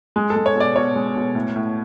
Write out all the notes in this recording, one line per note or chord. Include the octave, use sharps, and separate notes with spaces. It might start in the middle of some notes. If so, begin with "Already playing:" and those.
G#3
A4
G#3
C#5
B2 D5
B2 C#5
G#3
B2
A2
A2